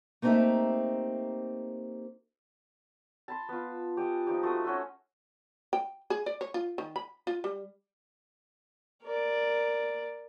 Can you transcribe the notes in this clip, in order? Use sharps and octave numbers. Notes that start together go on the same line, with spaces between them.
A3 A#3 C4 D#4 G4 E5
A5 B5 C6
B3 F4
G4 D#5 G#5 A5
F3 D#4 G4
A3 F#4 C6 D#6
C#4 F#4 D#5 E5
G5
G#4
D5
C#5
F4
D#3
B5
F4
G3
A#4 D5